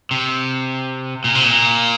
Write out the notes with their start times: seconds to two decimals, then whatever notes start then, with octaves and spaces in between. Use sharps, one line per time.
0.11 C3
1.24 A#2
1.35 C3
1.44 A#2